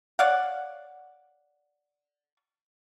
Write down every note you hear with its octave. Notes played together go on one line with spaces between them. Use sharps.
C#5 D5 F5 F#5